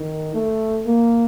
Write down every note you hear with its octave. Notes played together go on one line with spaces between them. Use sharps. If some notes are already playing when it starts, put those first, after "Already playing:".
Already playing: D#3
A3
A#3